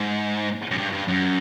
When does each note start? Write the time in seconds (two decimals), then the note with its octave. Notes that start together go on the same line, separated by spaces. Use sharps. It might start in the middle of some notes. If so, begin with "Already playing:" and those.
Already playing: G#2
0.71 F#2
0.77 G2
0.92 G2
1.08 F#2